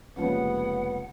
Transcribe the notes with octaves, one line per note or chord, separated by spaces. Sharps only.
F1 C#3 F3 G3 G#3 A#3 B3 F#5